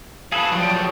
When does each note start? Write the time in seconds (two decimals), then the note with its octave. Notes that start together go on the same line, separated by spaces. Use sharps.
0.32 F#4 G#4 A4 B4 F5
0.52 F3 F#3 D5 G5 D#6
0.77 G#4 A4